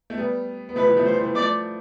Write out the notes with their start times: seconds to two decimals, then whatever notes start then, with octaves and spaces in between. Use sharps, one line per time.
0.10 A3
0.17 G3 B3
0.69 B3
0.76 F3 A3 B4
0.86 E3 G3
0.96 F3 A3
1.05 E3 G3 C5
1.20 E3 G3
1.35 F3 A3 D5